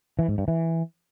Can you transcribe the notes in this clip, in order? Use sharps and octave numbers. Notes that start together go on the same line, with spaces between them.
E3
G#2
G2
E3